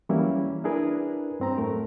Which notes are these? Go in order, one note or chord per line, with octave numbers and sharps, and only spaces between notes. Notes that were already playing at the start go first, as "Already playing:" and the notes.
E3 F#3 G3 A#3 C#4 E4
D4 E4 G#4 A#4 B4
G2 C4 A#5
F#2 A2 A3 A#4